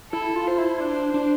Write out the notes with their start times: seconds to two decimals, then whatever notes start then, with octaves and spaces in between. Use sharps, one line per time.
0.12 E4 A4
0.36 F4
0.47 C5
0.58 E4
0.80 D4
1.14 D4